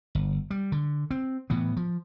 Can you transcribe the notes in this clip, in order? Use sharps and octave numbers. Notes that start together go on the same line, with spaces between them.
G1
G3
D3
C4
A2 E3 B3
F3